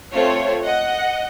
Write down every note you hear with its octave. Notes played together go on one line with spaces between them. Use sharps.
A3 C4 F4 C#5
D#5 F#5